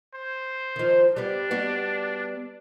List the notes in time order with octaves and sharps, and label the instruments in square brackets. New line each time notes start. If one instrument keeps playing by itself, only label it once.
[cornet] C5
[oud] D#3 F3
[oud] G3 B3 [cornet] D4
[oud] G3 B3 F#4